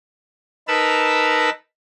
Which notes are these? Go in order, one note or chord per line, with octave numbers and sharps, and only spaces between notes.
D#4 A#4 B4 A5 B5 E6